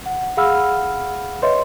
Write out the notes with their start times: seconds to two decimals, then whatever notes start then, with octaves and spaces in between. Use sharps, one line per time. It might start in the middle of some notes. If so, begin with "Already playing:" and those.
0.06 F#5
0.37 G#4 F5 F#5 B5 E6 F6
1.42 B4 C#5 D#5 E5 C6